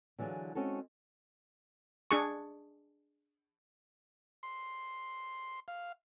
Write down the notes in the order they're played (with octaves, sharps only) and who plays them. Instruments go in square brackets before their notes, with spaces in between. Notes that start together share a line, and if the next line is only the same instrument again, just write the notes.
[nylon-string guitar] D3 E3 F#3 F4 G#4
G#3 C4 C#4 F#4 A4
[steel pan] D4 G#4 C#6
[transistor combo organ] C6
F5